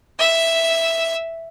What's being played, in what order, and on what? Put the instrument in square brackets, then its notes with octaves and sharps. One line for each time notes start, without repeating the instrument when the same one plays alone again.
[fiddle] E5 E6